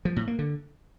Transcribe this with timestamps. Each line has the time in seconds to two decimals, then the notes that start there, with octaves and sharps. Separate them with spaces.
0.05 F3
0.16 A2
0.28 A#3
0.39 D3